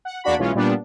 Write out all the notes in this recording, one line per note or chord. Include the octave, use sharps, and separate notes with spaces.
F#5
E2 A#3 D4 F#4 B5
B1 E3 G#3 C#4 F4
A#2 G3 B3 D4